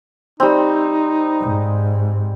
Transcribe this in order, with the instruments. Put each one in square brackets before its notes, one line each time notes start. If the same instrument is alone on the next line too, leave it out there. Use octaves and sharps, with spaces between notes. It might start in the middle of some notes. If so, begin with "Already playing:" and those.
[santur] G3 C4 [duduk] D#4
[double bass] G#2